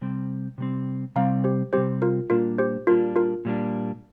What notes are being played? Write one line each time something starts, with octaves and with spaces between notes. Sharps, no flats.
C3 G3 C4
C3 G3 C4
C3 G3 C4 F5 A#5
G4 C5
C3 G3 C4 G4 C5
F4 A#4
A#2 G3 A#3 D4 F4 A#4
G4 C5
A#2 G3 A#3 D4 F4 A#4
F4 A#4
A#2 G3 A#3 D4